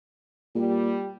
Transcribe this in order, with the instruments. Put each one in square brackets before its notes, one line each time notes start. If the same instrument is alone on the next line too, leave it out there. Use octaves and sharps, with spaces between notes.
[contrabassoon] A#2 [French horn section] G3 G4